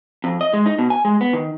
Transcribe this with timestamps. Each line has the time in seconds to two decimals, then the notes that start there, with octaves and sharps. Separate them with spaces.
0.24 F2
0.41 D#5
0.54 G#3
0.66 D#4
0.79 B2
0.90 G#5
1.05 G#3
1.21 B3
1.33 D#3